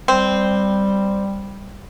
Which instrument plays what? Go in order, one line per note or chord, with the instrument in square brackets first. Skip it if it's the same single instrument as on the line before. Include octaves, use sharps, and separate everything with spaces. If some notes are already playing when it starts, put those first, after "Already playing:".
[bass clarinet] G3 [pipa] C4